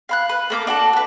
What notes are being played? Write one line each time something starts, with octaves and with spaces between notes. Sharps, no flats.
F5 B5 F#6
B4
A3 A#3 D6
D4 F#4 A4
F#4 B4